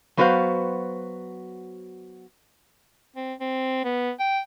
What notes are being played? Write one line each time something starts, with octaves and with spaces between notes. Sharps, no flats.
F#3 B3 F#4 B4 C5 F5
C4
C4
B3
G5